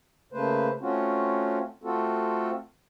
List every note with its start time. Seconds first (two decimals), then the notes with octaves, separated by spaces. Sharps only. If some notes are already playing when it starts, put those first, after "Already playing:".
0.33 C#3 A3 A#3 B4 C5
0.81 A3 C4 C#4 F4 F#4
1.83 A3 C4 F4 F#4 A4